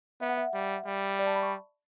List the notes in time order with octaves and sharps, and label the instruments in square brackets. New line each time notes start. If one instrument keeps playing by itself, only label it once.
[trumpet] B3 [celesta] E5
[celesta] F#5
E5
[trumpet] G3
G3
[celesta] D5
A5
B5
C#6